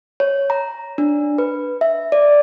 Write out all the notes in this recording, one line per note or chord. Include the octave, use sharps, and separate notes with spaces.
C#5
A#5
D4
B4
E5
D5